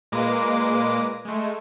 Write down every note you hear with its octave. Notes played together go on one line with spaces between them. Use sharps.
A#2 G#3 A#3 B4 D6 A#6
G#3 A3